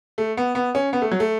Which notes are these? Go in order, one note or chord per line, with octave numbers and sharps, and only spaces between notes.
A3
B3
B3
C#4
B3
A3
F#3
A3